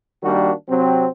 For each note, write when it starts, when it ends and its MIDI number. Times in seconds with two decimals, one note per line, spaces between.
0.23 0.52 51
0.23 0.52 55
0.23 0.52 58
0.23 0.52 62
0.23 0.52 66
0.69 1.07 48
0.69 1.07 54
0.69 1.07 60